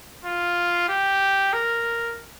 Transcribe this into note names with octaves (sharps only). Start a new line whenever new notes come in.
F4
G4
A#4